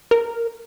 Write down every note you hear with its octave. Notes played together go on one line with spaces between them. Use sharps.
A#4